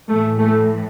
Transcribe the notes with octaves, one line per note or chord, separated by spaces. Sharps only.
A2 E3 A3
A3